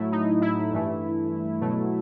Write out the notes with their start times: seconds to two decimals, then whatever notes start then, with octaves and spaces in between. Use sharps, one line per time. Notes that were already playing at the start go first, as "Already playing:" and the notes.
Already playing: A2 F#3 A3 E4
0.12 D#4
0.42 E4
0.72 G2 E3 A3
1.61 B2 F#3 A3